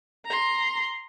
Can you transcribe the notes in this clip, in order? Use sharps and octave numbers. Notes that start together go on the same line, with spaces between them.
A#5 C6